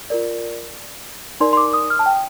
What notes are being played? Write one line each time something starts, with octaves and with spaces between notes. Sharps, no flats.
F4 A#4 D5
D#4 A#4 D5 C6
C6
D6
D#6
F6
A5
G5